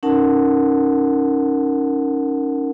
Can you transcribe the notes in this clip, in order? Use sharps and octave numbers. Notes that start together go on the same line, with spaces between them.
C#4 D#4 A#4 F#5 A5